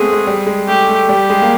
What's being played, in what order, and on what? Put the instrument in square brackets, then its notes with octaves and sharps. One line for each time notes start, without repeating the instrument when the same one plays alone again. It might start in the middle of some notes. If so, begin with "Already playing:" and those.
Already playing: [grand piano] G#3 A3 B3 C4 [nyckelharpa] G#4
[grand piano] G#3
G3
G#3
[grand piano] A3 [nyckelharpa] G4
[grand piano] A3
[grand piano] G3 [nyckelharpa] G4
[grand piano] G#3
A#3